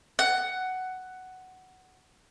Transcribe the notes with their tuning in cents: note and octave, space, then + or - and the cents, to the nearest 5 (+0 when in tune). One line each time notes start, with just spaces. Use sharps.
F#5 +10